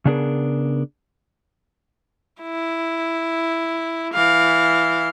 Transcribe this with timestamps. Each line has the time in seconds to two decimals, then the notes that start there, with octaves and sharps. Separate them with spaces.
0.05 C#3 B3 D4 F4 G#4 A#4
2.42 E4
4.14 E3 F5